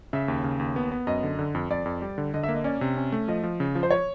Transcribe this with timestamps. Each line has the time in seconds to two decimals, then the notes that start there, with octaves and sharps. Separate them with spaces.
0.13 C#3 E5
0.28 D#2
0.44 C#3
0.59 D#2
0.76 B3
0.92 B3
1.07 F#2 D#5
1.23 D3
1.39 D3
1.55 F2
1.70 F2 D5
1.86 F2
2.02 G3
2.18 D3
2.34 D3 D#5
2.43 E5
2.48 A#3
2.54 D#5
2.64 C#4 D5
2.81 C3
2.97 C#4
3.12 A3
3.28 F3 D#5
3.43 F3
3.60 C#3
3.75 F3
3.83 C5
3.91 C#5